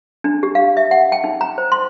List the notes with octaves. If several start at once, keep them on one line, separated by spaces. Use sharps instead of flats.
D4
G4
F5
E5
F#5
G5
D#4
A#5
C5
C6